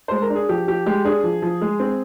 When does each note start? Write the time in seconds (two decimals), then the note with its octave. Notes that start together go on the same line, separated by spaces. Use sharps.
0.08 G#3 C5
0.22 A#4
0.30 D4
0.35 G#4
0.49 F3 G4
0.68 F3 G4
0.86 G#3 G4
1.05 D4 G#4
1.24 F3
1.42 F3
1.62 G#3
1.80 C4